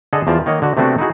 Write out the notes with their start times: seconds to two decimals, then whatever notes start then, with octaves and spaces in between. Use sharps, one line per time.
0.13 D3 G#4 A4 D#5 F#5
0.27 E2 F3 F4 D5 A5
0.46 D#3 A#3 C#5 D#5 F#5
0.62 D3 F#4
0.77 C3 A3 B3 C4 D4 F#4
0.98 D#4 E4 F#4 G#4